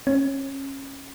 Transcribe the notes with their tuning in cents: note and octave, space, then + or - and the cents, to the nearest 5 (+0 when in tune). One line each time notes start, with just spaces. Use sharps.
C#4 -20